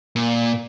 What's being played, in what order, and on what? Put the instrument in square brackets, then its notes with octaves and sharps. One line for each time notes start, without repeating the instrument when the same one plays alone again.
[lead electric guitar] A#2